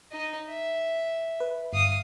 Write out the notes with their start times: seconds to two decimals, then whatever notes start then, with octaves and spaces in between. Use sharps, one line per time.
0.12 D#4 D#5
0.48 E5
1.40 B4
1.73 G1 F5 D#6